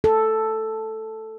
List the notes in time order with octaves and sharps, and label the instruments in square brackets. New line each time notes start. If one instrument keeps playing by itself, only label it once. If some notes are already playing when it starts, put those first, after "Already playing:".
[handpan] A4